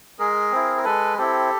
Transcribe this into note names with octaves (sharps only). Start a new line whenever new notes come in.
G#3 G#4 A#4
C4 E4
A#4
G#3 A4 B4
C4 E4 G4 A4